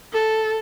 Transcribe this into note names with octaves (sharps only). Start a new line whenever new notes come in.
A4